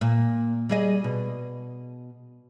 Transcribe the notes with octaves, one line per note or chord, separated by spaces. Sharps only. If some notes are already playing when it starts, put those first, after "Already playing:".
A#2
G3 G#4 D#5
B2